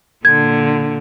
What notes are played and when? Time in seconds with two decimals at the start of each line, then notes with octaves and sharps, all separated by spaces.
0.25 A#2 D3 G#6